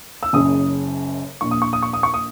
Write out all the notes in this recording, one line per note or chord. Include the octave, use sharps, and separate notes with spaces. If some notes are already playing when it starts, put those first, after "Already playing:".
E6
F#1 F#2 C#3 D#6
A#1 A#2 C#6
D#6
C#6
D#6
C#6
D#6
C#6
D#6